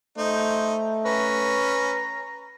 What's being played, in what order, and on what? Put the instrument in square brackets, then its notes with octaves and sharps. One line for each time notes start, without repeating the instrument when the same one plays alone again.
[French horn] A3 [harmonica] D#4 [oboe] C5
[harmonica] C#4 [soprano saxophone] B4 [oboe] A#5